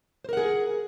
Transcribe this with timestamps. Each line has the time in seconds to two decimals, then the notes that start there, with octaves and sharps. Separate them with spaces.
0.24 C5
0.29 A#4
0.33 F#5
0.37 G#4